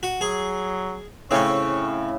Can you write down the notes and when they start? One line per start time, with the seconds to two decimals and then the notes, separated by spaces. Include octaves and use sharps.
0.03 F#4
0.21 F#3 G#4
1.31 A2 C#3 C4 C#4 C#5 E5